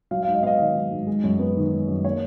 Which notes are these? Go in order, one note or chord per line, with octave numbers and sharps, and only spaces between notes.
F#3 F5
G#2 F5
D#5
B3 D#5 F5
D#3
F#3
G#2
G#3
F#2
B3
D#3
G#3
F#2
A#3 C#5